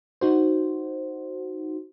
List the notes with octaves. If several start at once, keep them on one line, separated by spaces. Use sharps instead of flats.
D#4 F#4 C5